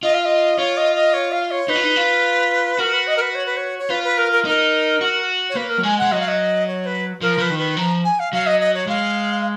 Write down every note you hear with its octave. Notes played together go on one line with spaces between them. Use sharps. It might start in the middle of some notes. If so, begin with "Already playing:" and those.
F4 D#5
F5
D#5
F4 C#5
D#5
D#5
C#5
F5
C#5
D#4 B4
F4
D#4
F4
F#4 A#4
B4
D#5
A#4
B4
C#5
B4
C#5
C#5
F4 B4
B4
A#4
A#4
D#4 A#4
F#4
C#5
A#3 B4
A#4
F#3
G#3 G#5
G#3 F#5
F#3 D#5
F5
D#5
C#5
B4
F3 A#4
F3 B4
D#3
B4
F3 A#5
G#5
F5
F#3 F5
D#5
D#5
C#5
G#3 F5